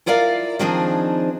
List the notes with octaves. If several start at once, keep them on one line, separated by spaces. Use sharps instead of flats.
E4 F4 A#4 D5 F5
D#3 F3 C4 D4 D#4 G#4